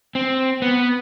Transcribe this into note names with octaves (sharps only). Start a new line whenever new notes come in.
C4
B3